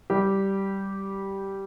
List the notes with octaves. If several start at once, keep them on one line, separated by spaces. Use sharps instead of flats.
G3 G4